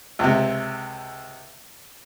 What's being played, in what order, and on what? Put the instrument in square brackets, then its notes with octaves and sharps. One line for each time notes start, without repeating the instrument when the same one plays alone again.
[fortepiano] C#2 C3